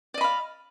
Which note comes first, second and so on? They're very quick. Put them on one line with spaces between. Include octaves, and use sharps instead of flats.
D5 D#5 B5 F5